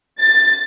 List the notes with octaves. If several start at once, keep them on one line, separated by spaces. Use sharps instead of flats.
A6